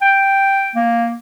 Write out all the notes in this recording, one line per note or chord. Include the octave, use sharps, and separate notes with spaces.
G5
A#3